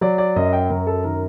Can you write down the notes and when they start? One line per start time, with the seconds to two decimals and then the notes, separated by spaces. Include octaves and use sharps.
0.01 F#3 D5
0.18 D5
0.36 F#2 D#5
0.53 G5
0.70 F#2 A#4
0.87 A4
1.04 D#3 A#4